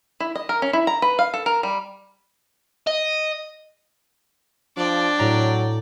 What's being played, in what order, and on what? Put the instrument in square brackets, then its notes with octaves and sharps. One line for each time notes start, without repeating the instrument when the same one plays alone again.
[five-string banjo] E4
D#5
A#4
C#4
E4
A#5
B4
F5
A4
A#4
G3
[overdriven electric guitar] D#5
[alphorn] F3 [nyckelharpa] D4 [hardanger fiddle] D5 G5
[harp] A2 A#5 [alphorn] F#3